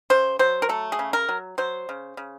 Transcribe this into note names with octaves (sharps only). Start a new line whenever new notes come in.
C#3 C5
F#3 C5
A#4
A3 A4
G#4
C#3
A#4
F#3
F#3 C5
C#3
C#3